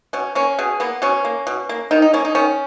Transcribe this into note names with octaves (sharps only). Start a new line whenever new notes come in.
B2 C#4
A#3 C#4
B2 G#4
A#3 B3
B2 C#4
A#3
B2
A#3
D#3 D#4
D#4
A#3 C#4
D#4
D#3 C#4